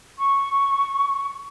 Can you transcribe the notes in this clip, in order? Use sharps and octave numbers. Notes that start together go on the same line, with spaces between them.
C#6